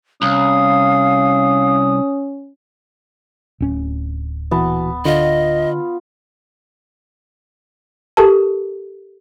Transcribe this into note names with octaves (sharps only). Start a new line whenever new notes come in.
C2 C#4 F5 D#6
D1 C#4
A#2 E3 B3 F#4 A5
D3 F4 D#5
G4 A4 A#4 A5